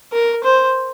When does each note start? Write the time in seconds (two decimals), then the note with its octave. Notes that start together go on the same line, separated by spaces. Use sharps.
0.12 A#4
0.44 C5